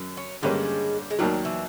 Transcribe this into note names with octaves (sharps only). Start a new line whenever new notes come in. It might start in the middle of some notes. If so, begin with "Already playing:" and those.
Already playing: F#2 F#3
C#4
G2 D3 G3 G#3 A#3 C#4
G#3
D#2 D#3 F#3 G3
E3